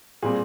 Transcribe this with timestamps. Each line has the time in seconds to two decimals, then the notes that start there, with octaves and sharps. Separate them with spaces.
0.22 A#2 G3 C4 G#4